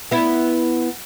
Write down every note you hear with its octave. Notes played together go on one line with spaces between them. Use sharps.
B3 E4